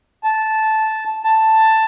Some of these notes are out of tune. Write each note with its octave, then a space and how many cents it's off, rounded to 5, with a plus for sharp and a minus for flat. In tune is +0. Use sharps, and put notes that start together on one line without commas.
A5 -10
A5 +5